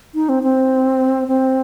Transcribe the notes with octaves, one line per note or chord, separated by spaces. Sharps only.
D#4
C4
C4
C4